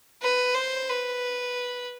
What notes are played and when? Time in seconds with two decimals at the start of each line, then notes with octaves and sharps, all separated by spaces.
0.22 B4
0.55 C5
0.89 B4